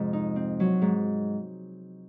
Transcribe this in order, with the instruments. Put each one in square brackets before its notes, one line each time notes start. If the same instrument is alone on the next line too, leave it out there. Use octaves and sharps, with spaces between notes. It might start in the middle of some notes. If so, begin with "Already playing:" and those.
Already playing: [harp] F2 G#2 C3 G#3
D#4
C4
F#3
G#2